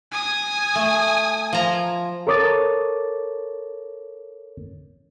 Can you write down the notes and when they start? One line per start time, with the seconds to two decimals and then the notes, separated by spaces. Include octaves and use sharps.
0.11 G#5 D#6
0.75 A3
1.53 F3 A#5
2.27 A4 A#4 C#5 D6 D#6 A6